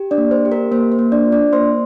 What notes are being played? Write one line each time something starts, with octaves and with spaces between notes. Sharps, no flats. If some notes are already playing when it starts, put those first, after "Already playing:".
Already playing: G4
D4 D5
A#3
C5
G4
A#4
A#3 C5
C5
A#3
D4 D5
F4
D4 D5
A#3 C5 C6